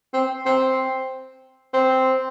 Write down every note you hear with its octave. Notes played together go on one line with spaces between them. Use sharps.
C4
C4
C4